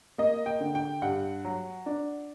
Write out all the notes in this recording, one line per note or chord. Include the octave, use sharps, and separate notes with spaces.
A#3 D#5
G5
D3
G5
G2 F#5
F#3
D4